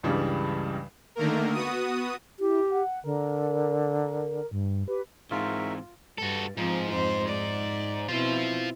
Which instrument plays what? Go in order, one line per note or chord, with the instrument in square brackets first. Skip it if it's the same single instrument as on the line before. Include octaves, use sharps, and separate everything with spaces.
[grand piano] C#2 G2 C#3 E3 G3
[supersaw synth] D3 D#3 A3 A#3 A#4
B3 F#4 D#6
[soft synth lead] E4 [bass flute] G4
[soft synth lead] F#5
[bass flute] D3 [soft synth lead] A#4
[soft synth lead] G2
[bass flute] G4 [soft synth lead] B4
[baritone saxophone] G#2 [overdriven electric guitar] E3 C4 [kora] F4 [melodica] A#4 E5 C#6
[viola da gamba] G2 [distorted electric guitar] F#4 A4
[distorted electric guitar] G#2 [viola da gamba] F3 C4
[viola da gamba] F2 C5
D5
[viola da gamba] B2 C4 E4 [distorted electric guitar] F4 C5